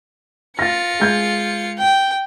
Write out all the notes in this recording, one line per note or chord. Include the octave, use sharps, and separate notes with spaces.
F4 A6 A#6 C#7
G#3 G6 G#6
G5